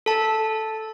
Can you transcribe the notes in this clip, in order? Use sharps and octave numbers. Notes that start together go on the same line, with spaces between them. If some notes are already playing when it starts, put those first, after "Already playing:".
A4 A5